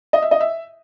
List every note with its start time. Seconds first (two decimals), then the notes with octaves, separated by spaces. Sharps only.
0.13 D#5
0.22 E5
0.31 D#5
0.40 E5